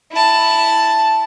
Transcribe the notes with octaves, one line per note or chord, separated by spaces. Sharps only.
E4 A5